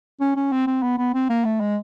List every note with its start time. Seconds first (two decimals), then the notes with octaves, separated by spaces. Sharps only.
0.21 C#4
0.36 C#4
0.52 C4
0.67 C4
0.83 B3
0.98 B3
1.14 C4
1.30 A#3
1.45 A3
1.60 G#3